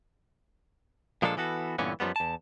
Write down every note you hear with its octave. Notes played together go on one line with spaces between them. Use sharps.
A#2 F3 G#3 A#3 D4 A4
E3 B3 F#4 A4
G2 A#2 D3 E3 B3 C#4
F#2 F3 G3 B3
E2 A5